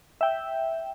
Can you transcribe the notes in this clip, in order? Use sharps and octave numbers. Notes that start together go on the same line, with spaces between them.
E5 G5